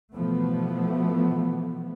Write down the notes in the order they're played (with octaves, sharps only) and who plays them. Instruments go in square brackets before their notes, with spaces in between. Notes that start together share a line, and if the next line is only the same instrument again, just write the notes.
[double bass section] B2 E3 F3 A3 B3